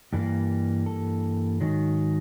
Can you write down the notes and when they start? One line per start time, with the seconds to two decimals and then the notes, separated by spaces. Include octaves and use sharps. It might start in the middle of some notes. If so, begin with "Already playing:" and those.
0.13 G2 E3 G3 A#3
0.86 A4
1.61 G#2 D#3 F#3